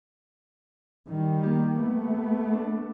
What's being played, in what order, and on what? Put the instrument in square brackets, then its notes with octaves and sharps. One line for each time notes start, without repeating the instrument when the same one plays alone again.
[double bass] D#3 G3
[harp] A#3 G4
[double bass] A3 B3
[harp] D4